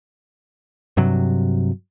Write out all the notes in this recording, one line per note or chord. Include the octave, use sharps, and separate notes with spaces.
G2 C3 F#3